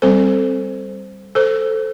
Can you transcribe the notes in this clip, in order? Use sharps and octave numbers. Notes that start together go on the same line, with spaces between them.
G3 C4 A4 C5
A4 C5